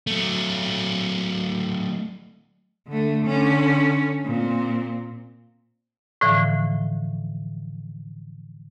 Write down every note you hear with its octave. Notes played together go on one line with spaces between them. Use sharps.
F#3 A3
D3 A3
D3 C#4
A#2 C4
A2 D3 E3 F3